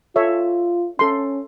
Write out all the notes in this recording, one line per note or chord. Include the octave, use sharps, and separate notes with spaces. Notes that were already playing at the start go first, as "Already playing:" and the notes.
F4 A4 C#5 E5
C#4 A4 C6